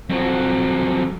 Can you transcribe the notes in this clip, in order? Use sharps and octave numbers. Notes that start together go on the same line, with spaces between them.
F2 F#3